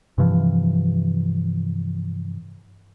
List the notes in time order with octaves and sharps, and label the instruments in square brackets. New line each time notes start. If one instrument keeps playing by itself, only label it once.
[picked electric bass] G2 C3 E3 F3